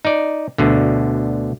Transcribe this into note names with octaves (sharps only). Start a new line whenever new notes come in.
D#4 D5
D2 B2 D3